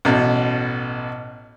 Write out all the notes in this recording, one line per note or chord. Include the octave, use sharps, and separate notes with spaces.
A1 B2